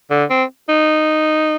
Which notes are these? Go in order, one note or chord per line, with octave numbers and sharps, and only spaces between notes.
D3
C4
D#4